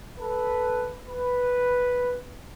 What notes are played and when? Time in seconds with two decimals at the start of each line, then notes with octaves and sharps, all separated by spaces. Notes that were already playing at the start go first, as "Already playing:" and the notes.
0.18 A4 B4
1.08 B4